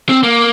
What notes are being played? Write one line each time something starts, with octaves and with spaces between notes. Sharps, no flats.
C4
A#3